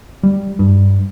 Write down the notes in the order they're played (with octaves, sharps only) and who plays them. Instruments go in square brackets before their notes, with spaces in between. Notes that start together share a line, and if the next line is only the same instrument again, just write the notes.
[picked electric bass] G3
G2